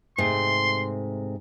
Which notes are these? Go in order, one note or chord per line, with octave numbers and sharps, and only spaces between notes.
G#2 C3 A3 C6